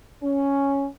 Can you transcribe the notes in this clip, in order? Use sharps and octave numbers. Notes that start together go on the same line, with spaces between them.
C#4